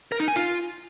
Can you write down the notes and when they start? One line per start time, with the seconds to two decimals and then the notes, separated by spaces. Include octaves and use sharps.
0.12 A#4
0.20 D#4
0.28 G#5
0.36 F4